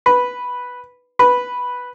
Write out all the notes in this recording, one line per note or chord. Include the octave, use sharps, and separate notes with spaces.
B4
B4